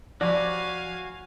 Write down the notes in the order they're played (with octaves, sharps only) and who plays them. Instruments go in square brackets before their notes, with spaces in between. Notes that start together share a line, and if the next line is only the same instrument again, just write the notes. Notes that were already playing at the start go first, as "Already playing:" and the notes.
[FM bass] F3 [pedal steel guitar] F#4 C#5 B5 [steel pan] D5 [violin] F5 G#5